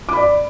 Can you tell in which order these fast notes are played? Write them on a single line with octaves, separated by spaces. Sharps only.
D6 B5 D5